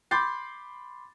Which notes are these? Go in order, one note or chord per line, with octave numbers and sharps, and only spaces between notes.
B5 C6 D6 G6 A6 C7